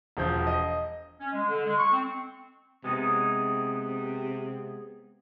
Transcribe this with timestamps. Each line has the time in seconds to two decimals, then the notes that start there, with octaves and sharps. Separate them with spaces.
0.17 E1 F3 G6
0.47 D#5
1.20 C#4
1.33 G#3
1.49 D3
1.66 G#3
1.78 C#6
1.92 C4
2.84 C3 G#3 B3 D#4